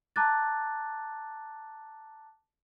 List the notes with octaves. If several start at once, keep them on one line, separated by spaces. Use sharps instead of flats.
A5 A#5 D6 F#6 A6